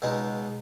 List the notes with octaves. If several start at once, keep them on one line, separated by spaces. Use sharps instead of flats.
C#2 B2 G#3 D#4